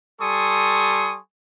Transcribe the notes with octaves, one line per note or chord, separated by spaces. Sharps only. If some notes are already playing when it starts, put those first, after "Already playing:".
G3 A4 G#5 C6 C#6 D#6